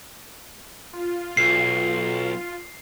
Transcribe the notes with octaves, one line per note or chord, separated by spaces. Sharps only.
F4
B1 C7